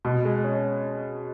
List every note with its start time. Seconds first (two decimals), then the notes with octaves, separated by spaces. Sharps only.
0.05 B2
0.25 G#3
0.44 C#4